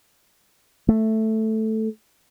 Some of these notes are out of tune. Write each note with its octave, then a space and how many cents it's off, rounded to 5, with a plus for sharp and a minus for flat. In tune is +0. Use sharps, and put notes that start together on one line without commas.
A3 +0